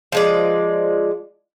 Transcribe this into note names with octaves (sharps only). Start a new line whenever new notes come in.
F3 G#3 D5